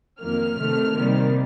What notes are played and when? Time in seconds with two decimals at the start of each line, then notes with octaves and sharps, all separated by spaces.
0.21 F2 D#3 A#3 F6
0.59 C3 D#3 A3
0.96 C3 D#3 G3 A#3